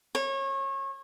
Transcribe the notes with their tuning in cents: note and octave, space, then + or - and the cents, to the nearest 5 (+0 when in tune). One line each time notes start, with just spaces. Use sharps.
C#5 -30